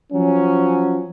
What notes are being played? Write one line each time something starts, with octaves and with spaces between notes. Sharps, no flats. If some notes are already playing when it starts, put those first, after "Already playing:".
F3 F#3 C#4